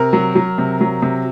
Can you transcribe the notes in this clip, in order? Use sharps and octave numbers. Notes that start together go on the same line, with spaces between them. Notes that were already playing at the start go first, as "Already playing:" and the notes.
Already playing: C3 A#4
F#3
F#3
C3
F#3
C3